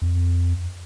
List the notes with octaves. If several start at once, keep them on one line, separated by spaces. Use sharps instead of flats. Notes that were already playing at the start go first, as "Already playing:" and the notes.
F2